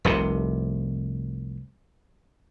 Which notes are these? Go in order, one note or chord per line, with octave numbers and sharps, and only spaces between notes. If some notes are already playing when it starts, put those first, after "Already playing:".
F1 C2 C3